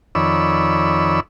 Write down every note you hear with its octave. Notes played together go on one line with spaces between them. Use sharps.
F2 D#3 C#5 D5 B5 E6